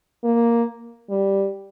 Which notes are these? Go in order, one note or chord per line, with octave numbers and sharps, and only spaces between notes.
A#3
G3